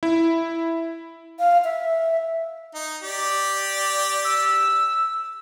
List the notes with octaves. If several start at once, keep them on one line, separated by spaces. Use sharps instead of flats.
E4
F5
E5
D#4
G4 D5
E6